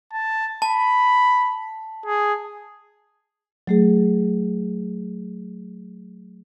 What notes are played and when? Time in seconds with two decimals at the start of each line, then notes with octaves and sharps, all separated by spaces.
0.13 A5
0.62 A5 B5
2.06 G#4
3.67 F#3 A3 G#4